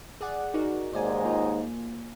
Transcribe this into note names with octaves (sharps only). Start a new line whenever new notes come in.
G#4 D5 F#5
D#4 F#4 A#4
D#2 G#2 D#4 C5 D5 G#5
A#3 F4